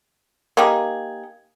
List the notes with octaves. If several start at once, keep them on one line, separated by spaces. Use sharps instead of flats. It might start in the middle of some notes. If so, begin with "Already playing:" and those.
A#3 D#4 G4 G#4